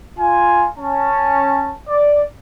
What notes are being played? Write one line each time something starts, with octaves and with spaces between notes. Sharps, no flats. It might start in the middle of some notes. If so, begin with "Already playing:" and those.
F4 G#5
C#4 A5
D5